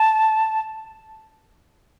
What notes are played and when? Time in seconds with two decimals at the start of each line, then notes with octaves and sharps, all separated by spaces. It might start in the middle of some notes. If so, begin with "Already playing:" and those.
Already playing: A5